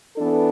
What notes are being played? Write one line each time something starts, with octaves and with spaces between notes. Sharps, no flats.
E3 B3 D4 A4